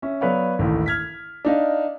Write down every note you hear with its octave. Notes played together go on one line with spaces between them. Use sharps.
C#4 E5
F#3 B3 B4 C#5 D5 F5
A1 D#2 A2
F6 G#6 B6
D4 D#4 F5